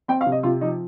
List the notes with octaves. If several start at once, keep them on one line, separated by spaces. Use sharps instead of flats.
C4 G5
F5
C3
D#5
C3 F4
F3 D#4